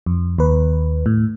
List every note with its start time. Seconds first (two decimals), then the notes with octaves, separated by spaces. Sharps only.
0.06 F2
0.38 D#2 B4
1.06 A2